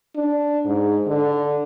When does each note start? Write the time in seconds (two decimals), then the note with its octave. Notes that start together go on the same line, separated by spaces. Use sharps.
0.16 D4
0.66 G#2
1.07 D3